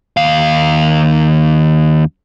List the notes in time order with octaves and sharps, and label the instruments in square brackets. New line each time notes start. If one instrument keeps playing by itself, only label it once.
[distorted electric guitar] D#2 F5